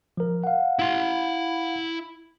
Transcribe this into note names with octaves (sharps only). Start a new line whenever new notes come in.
F3 A#4
F5 F#5
E4 C6